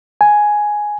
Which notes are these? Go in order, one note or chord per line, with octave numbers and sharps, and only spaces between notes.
G#5